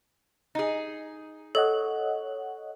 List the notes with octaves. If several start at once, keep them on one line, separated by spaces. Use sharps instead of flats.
D#4 G#4
A4 C#5 D#5 F#5